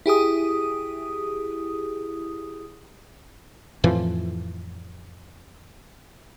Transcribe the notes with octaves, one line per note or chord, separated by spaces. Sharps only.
E4 G4 G#4 D#6
F2 A2 E3 F3